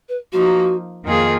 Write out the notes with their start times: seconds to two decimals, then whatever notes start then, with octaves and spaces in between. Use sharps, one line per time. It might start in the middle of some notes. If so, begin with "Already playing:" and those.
0.09 B4
0.33 F3 A#3 D#4 F#4
1.04 F2 D#3 A#3 F4 G#4